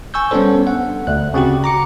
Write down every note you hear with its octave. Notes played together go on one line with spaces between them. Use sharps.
G#5 C#6 E6 G6
G3 B3 C#4 D4 A4 C5
F#5
D2 F#6
C#3 C4 F#4 G4
A#5 D6 C#7